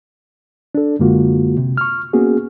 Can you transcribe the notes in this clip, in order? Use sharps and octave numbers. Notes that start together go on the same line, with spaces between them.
D4 A4
F#2 D3 G#3 A#3 F4 F#4
C3
C#6 F6
A#3 B3 C#4 F#4 G#4